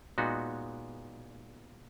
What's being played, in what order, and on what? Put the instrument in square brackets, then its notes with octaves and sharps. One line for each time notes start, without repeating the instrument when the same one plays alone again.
[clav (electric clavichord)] A#2 G#3 B3 D#4 F#4